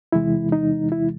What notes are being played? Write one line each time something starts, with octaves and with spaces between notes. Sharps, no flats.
E2 C3 E3 G#3 E4
D#4
E4